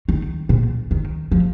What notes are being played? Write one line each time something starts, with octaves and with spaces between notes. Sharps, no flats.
D#3
A#2
D#3
F3